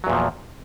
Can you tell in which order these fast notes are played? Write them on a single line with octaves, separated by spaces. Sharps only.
F#3 E2 A#2 F3